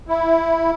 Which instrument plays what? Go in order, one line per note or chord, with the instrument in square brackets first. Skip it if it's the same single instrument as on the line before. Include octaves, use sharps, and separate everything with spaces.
[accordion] E4